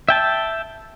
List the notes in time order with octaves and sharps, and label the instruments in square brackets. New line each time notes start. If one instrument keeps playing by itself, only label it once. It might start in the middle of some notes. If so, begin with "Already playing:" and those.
[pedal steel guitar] E5 G5 A5